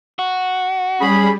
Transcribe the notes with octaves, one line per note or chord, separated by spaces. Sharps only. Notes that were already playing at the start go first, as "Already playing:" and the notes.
F#4
G3 C#4 G#4 B5